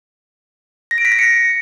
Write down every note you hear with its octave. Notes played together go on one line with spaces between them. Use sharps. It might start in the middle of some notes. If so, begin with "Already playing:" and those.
A#6
D7
B6
A#6
C#7